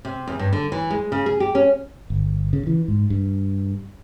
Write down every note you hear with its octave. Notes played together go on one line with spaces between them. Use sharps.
C3
E2
G2
D3
E3
G#3
C#3
G#4
G4
C#4
G1
C#3
E3
G#2
G2